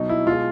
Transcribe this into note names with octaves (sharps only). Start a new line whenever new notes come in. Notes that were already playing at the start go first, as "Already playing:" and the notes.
Already playing: B2 F#3 D#4
E4
B2 F4
G#3